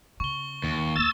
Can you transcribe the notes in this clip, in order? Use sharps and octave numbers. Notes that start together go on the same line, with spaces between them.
C#3 C#6 G7
D#2
D#2 A#3 E6 A6